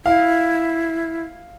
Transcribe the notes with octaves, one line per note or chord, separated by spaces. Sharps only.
E4 F5